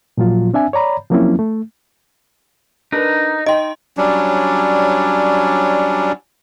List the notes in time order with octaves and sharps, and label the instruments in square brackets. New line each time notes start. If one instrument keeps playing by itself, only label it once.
[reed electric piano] A#2 F3 F#3 F4
C4 D4 E5 G#5
C#5 D5 A#5 B5
F3 F#3 A#3 C4 C#4 E4
A3
[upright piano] D4 A#4 B4 [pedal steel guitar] D#4
[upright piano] D#4 G5 [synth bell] D#5 C6
[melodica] F#3 G3 C#4 D4